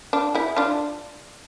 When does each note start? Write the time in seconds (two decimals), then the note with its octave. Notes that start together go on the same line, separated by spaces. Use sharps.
0.13 D4 F4
0.35 E4 G#4
0.56 D4 F4